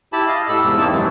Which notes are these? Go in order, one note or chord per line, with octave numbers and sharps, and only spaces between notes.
E4 G4 A5 B5
D#5 F5
A2 G4 A4 B5 E6
E2 G#2 C3 G#3 E6
A#3 C4 D#4 E4 A5
F#2 C3 D#3 E3 F#3 G#3